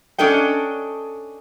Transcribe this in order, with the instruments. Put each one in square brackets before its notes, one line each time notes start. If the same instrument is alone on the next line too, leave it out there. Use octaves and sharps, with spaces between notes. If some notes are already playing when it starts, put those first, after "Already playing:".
[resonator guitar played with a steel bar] C#4 D4 A4 D#5 G5